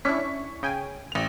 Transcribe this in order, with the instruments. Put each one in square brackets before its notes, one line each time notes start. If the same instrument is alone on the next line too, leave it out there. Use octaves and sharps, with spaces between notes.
[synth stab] C#4 D4 E4 [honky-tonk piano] C#6 B6
[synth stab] C#3 G5 G#5
[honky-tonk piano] A1 F7